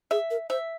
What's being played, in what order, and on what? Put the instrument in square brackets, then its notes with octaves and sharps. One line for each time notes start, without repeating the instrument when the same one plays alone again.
[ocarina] G#4 [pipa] E5
[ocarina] A#4
[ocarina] C5 [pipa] E5